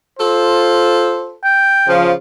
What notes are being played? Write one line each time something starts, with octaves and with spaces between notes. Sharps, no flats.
F4 A4 C5
G5
C#3 F3